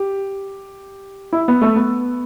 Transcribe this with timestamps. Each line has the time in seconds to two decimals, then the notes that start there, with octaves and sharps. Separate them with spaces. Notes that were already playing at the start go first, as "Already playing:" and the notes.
Already playing: G4
1.33 E4
1.48 B3
1.62 A3
1.76 B3